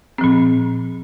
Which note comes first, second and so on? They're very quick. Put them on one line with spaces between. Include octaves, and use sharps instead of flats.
C4 F3 A#2